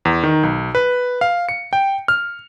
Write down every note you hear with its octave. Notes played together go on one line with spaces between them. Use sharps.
E2
D#3
B1
B4
F5
C#7
G5
F6